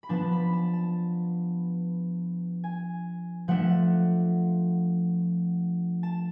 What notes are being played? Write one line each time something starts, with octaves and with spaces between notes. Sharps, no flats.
B5
F3 B3 D4 A5
B5
A5
A5
G#5
F3 A3 D4 F#5
F#5
A5